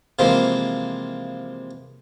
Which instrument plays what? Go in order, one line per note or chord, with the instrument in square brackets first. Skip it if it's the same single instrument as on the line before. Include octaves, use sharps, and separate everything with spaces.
[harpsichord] C3 E3 F3 G#3 A#3